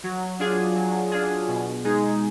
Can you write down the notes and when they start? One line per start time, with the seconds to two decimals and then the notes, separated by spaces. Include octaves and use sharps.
0.04 F#3
0.39 D4 F4 G#4
0.76 F#3
1.12 D4 F4 G#4
1.48 B2
1.85 G#3 D#4 G#4